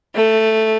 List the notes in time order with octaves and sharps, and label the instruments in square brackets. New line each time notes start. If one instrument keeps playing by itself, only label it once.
[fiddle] A3